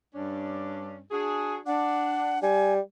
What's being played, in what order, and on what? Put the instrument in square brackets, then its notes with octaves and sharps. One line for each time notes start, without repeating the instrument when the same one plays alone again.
[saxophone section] G2 C#4 D4
D4 F#4 G#4
[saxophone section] D4 [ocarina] F#5
[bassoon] G3 [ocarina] G#5